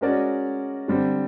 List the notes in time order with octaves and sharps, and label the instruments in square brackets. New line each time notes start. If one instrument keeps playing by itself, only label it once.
[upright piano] G#3 C#4 F#4 A#4 D5
D3 G3 C4